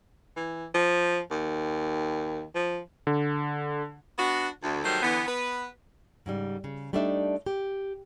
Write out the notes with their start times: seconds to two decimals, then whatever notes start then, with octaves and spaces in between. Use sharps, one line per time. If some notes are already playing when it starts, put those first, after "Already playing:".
0.36 E3
0.74 F3
1.31 D#2
2.55 F3
3.07 D3
4.19 B3 D4 F#4
4.63 D2
4.84 D#3 F#3 G3 A3 C5
5.03 D3 E3 B3
5.27 B3 B4
6.26 G#2 C#3 G3
6.64 C#3
6.93 G3 A3 D4 D#4 D5 E5
7.46 G4